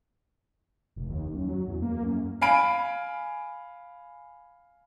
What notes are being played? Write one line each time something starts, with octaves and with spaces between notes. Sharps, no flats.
F1
D#2
F#2
F#3
E2
A#3
F#2
F5 G#5 B5 D7